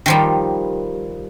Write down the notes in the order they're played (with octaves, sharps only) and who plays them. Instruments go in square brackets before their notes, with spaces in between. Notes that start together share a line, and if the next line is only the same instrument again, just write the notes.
[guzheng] D#3 F3 G3